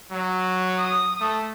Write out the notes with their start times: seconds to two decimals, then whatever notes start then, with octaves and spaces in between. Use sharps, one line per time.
0.12 F#3
0.77 D#6
1.21 A3